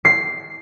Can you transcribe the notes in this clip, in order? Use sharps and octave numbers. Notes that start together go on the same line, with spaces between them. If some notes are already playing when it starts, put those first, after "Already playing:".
C7